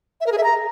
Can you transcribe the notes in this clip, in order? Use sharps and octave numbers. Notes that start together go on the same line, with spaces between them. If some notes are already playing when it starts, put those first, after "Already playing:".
E5
A#4
G#4
E5
A#5